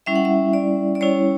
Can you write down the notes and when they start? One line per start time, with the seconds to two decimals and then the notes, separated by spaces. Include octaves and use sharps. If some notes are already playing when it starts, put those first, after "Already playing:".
0.06 G3 C#4 E4 E5
0.15 F#5
0.25 E5
0.53 D5
0.95 D5
1.01 G3 C#4 E4 C#5